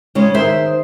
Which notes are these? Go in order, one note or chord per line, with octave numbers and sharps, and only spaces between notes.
C#3 G#3 C#4
D#3 G#4 C5 E5